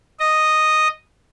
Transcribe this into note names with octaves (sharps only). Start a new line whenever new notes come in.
D#5